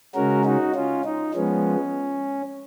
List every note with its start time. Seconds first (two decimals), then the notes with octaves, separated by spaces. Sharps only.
0.14 C#3 G#3 C#4 F#4 A#4
0.44 D#4 F#4
0.75 C#4 F4
1.05 D#4
1.34 F3 G#3 B3 C#4